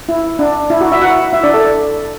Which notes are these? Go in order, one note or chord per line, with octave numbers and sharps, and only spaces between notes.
E4
D4
E4
F#4
E4 E5
F#4 F#5
E4 E5
D4 D5
A4